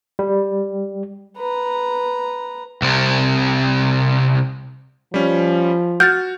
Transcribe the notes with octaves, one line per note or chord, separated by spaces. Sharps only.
G3
B4 A#5
C2 C3
F3 G3 C#4
F#4 F6 G6 A6